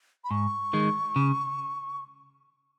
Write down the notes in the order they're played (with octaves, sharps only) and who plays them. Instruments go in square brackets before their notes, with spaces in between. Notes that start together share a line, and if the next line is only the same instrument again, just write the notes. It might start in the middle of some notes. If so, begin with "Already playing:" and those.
[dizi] B5
[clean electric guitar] G#2 [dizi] C#6
[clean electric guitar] D#3 G#3
C#3